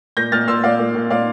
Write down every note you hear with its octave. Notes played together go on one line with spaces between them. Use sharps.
A#2 G6 A#6
A#2 F6 A6
A#2 C6 E6
A#2 D5 F5
A#2
A#2
A#2 D5 F5